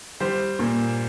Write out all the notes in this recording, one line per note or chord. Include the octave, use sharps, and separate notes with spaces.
G3 C5
A#2